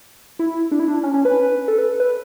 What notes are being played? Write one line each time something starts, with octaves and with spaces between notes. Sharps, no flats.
E4
D4
E4
D4
C#4
C#4
B4
A4
B4
B4